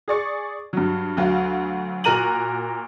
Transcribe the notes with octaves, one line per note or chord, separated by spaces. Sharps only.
G#4 D5 C#6
G2 F#3
D2 F#3 F5
A#2 F#4 A#4 A#5 D#7 F#7